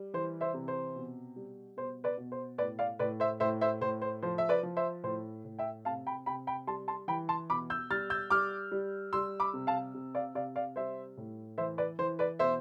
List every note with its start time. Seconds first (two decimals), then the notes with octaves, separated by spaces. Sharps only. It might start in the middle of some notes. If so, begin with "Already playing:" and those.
Already playing: G3
0.14 E3 C5
0.41 C5 E5
0.54 C3
0.68 C5
0.96 B2
1.36 G3
1.77 B2 C5
2.04 B4 D5
2.18 B2
2.32 C5
2.58 A2 B4 D5
2.79 D5 F5
2.99 A2 B4 D5
3.20 C5 E5
3.40 A2 C5 E5
3.61 C5 E5
3.81 A2 C5
4.02 C5
4.23 F3 C5
4.38 E5
4.49 B4 D5
4.63 F3
4.77 C5 E5
5.03 A2 C5
5.45 A2
5.59 E5 G5
5.85 C3 F5 A5
6.07 G5 B5
6.26 C3 G5 B5
6.47 G5 B5
6.67 G3 A5 C6
6.88 A5 C6
7.08 E3 G5 B5
7.29 A5 C6
7.50 B2 B5 D6
7.70 E6 G6
7.90 G3 F6 A6
8.10 E6 G6
8.30 G3 D6 F6
8.71 G3
9.13 G3 C6 E6
9.40 B5 D6
9.53 C3
9.67 F5 A5
9.94 C3
10.15 D5 F5
10.35 C3 D5 F5
10.56 D5 F5
10.76 G3 C5 E5
11.17 A2
11.58 E3 C5 E5
11.78 B4 D5
11.99 E3 C5
12.19 B4 D5
12.39 B2 C5 E5